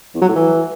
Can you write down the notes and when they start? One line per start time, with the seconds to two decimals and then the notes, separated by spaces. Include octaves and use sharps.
0.14 E2
0.21 F#3
0.28 A2
0.35 E3